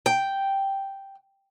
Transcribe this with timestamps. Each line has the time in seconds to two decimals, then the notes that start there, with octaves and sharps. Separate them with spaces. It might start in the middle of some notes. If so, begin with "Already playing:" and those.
0.06 G5